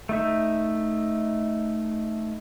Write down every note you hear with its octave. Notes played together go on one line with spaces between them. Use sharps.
A3 D#4 E5